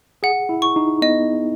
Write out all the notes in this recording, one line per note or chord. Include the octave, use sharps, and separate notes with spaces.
G#4 F#5
E4
C#6
D#4
B3 D#5